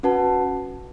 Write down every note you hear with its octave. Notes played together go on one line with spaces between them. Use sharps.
C#4 F#4 B4 F#5 A5